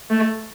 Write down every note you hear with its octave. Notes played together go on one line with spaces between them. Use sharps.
A3